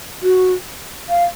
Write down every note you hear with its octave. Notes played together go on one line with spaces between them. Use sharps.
F#4
F5